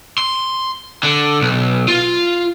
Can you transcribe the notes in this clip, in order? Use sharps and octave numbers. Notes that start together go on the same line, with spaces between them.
C6
D3
B1
F4